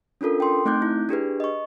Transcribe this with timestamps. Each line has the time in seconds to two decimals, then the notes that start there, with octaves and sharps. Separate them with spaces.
0.21 C#4 D4 F4 A4 A#4
0.40 G5 C6
0.65 A3 C4 D#4 D6 F#6 G6
0.82 E4
1.09 D4 G4 G#4 B4
1.40 D#5 C#6